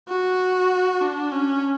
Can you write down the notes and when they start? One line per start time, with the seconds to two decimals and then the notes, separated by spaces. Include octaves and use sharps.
0.09 F#4
1.02 D4
1.32 C#4